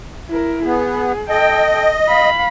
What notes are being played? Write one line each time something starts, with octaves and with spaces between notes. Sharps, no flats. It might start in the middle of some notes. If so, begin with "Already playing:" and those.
E4 A#4
B3 G#4
A4 D#5 G5
F5 B5